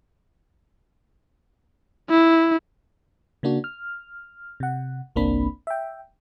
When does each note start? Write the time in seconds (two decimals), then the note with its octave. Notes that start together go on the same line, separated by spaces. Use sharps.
2.10 E4
3.43 C#3 A#3 D4 F#4
3.64 F6
4.60 C3 F#5
5.16 G1 C2 A#3 C4 D4 B5
5.67 E5 G5